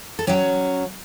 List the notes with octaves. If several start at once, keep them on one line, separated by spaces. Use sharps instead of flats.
A4
F#3 C#4 G4